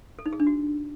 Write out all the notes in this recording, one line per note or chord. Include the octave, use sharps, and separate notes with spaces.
A4
D#4
G#4
D4
F#4